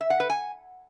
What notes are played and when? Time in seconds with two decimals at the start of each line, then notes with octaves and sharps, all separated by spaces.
0.01 E5
0.10 F#5
0.20 B4
0.30 G#5